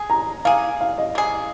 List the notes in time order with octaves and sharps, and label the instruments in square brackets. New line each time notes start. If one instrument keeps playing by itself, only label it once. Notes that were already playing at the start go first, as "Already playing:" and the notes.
Already playing: [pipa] G#4
[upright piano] A#5
[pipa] A#3 G#4 [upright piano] F5
[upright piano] F5
D#5
[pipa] A#3 G#4